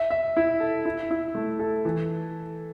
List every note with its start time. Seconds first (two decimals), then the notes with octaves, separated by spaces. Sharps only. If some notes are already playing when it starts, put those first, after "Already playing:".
Already playing: E5
0.11 E5
0.37 E4
0.60 A4
0.85 E4
1.11 E4
1.35 A3
1.59 A4
1.85 E3